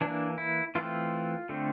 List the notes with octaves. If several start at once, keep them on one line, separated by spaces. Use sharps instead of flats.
E3 A#3 D4
E4
E3 A3 C4 F4
D3 A3 C4